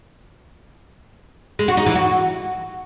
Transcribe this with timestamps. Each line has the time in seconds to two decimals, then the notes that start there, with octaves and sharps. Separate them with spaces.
1.59 G#3
1.68 F#4
1.77 D#4
1.86 E3
1.95 F#4